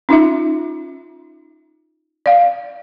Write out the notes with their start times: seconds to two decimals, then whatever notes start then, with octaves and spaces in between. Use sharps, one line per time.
0.09 C#4 D#4 F4 E5
2.26 D5 F5